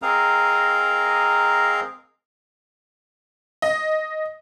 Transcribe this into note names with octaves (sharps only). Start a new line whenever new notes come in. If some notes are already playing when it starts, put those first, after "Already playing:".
C4 G#4 A#4 D#5 F5 A#5
D#5